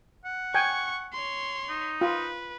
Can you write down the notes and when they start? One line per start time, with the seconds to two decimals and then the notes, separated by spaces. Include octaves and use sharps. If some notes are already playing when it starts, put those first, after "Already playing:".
0.25 F#5
0.54 G5 G#5 C#6
1.13 C#5 C6
1.69 D#4
2.01 F4 B4